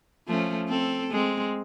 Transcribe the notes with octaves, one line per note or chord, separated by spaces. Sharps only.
F3 A3 C#4
C4 A4
G#3 C4